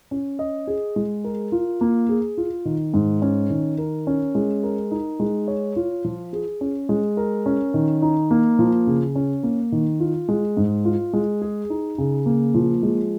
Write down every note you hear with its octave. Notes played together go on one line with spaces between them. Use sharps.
C#4
D#5
G#4
G#3
A#4
F4
A#3
G#4
F4
D#3
G#2
C#4
D#3
A#4
C#4
G#3
A#4
D#4
G#3
C#5
F4
F3
G#4
C#4
G#3
A#4
C#4
D#3
D#4
A#3
F3
C#3
C#4
A#3
D#3
F4
G#3
G#2
F4
G#3
G#4
D#4
C#3
A#3
F3
G#3